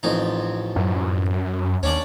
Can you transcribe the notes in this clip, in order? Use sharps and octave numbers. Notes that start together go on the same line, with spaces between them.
A1 F2 D#4
F#2
D#2 C#4 D4 D5